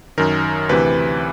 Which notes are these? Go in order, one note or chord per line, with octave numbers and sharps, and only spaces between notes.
F#2 D#3 A#4
D2 C3 E3 B4